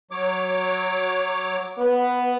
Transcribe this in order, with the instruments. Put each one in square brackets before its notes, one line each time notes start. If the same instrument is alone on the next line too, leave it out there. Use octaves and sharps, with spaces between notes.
[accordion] F#3 C#5 D6
[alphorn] B3